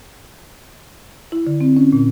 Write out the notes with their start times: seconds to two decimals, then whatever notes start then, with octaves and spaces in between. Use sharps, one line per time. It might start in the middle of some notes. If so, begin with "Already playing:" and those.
1.32 E4
1.47 D3
1.61 C4
1.77 C#4
1.93 A#2